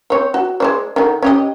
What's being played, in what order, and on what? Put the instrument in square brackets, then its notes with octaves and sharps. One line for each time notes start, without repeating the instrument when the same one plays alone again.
[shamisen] C4 C#5
F#4
G#3 C5 D5
D3 D#3
C#4 G4 D#5